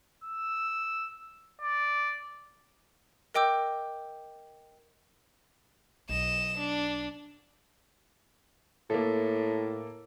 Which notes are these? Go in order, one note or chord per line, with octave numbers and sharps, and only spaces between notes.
E6
D5
A#4 D#5 G5 D6 E6 G6
B1 D#5 E7
D4
A2 A#3 A4